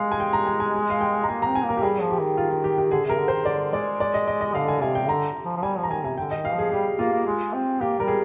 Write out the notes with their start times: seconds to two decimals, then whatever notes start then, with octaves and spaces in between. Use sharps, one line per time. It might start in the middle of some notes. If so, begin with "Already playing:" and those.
Already playing: G#3 F5
0.12 G#5
0.20 G5
0.33 A#5
0.47 G#5
0.60 G#5
0.90 F5
1.01 G5
1.24 A#5
1.29 A#3 G#5
1.42 C4 A#5
1.55 G#5
1.65 A#3 A#4
1.77 G4
1.83 G3 G#4
2.01 F3
2.10 G4
2.19 D#3
2.37 F4
2.50 F4
2.64 G4
2.78 G4
2.91 D3 G#4
3.05 C3 A#4
3.19 D3
3.28 D#3 C5
3.45 D3 D5
3.73 G#3 D5
4.00 D5
4.14 D#5
4.28 D#5
4.41 D#5
4.54 D3 F5
4.68 G#5
4.82 C3 G#5
4.95 G5
5.09 D3 A#5
5.45 F3
5.57 F3
5.63 G3 G#5
5.77 F3
5.83 A#5
5.90 D#3 G#5
6.04 C3 G#5
6.18 D3 G5
6.31 D#3 D#5
6.45 F5
6.54 F3 G#4
6.72 G3 G4
6.99 A#3 F4
7.13 A#3
7.27 G#3
7.53 C4
7.81 A#3 G4
7.99 G3 A#4
8.07 G#4